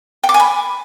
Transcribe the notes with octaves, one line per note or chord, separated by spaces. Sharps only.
G5
D6
G#5
B5